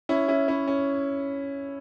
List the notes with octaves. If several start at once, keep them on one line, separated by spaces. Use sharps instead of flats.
C#4 E4
C#4 E4
C#4 E4
C#4